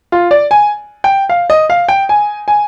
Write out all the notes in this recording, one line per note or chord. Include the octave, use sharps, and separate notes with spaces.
F4
D5
G#5
G5
F5
D#5
F5
G5
G#5
G#5